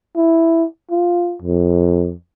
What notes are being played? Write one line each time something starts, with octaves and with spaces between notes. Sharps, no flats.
E4
F4
F2